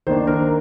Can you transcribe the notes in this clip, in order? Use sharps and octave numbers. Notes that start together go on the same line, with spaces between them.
D#3 A#3 D4 C5
A#4